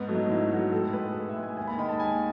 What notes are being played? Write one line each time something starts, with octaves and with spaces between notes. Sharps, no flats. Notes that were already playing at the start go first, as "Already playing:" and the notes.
Already playing: G#2 B3
F#3 A3
D#4
G#2 E4
F#3 A3 F#4
A2 A4
G#3 B4
A2
E5
G#3
G#5
D#2 G#5
B5
D#3 G#3 B5
A5
D#2 G#5